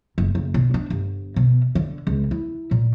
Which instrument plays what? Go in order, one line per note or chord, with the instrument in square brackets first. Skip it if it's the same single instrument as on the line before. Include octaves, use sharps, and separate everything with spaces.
[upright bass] F#1
F#1
B2
D4
G1
B2
D3
C#2
E4
A#2